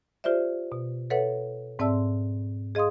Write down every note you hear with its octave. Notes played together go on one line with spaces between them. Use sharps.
F4 G4 C5 D5 E5
B2
A4 B4 C#5 E5 F#5
G#2 C4 D5 E5 A5 E6
G#4 D#5 F5 C6 D#6